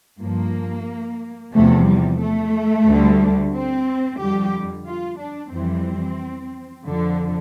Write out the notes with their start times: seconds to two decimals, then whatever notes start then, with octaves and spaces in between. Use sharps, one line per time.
0.20 G2 F3 A#3
1.53 E2 C3 F3 A3
1.86 G3
2.20 A3
2.87 D2 D3 G3
3.53 C4
4.19 F2 D3 G3 G4
4.86 F4
5.19 D4
5.52 F2 E3 G3 C4
6.86 F2 D3 F3